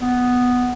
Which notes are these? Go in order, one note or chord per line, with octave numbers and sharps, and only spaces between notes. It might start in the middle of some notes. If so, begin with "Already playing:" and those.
B3